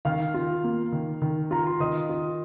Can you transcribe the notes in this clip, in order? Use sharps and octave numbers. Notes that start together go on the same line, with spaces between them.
D#3 F5 F6
F4
A#3
D#3
D#3
F4 A#5
C6
D#3 D#5 D#6
F4